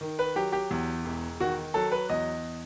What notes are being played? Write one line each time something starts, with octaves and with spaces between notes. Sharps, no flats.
D#3
B4
F#3 G4
G4
E2
E1
D#3 F#4
F#3 A4
B4
E2 D#5